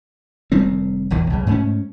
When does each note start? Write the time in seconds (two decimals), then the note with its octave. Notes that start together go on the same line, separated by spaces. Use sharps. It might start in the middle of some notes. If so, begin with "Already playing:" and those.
0.52 F1 D#3 G3 C4
1.11 E1 A#1 E2 D#3
1.30 B1 C#3
1.47 G#2 A3 C#4